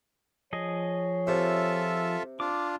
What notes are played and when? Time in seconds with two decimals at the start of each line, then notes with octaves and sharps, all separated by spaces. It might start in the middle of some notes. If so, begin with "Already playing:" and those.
0.53 F3 G#4 C#5 D#5
1.27 C3 F4 A4 E5
2.40 D4 F4 D6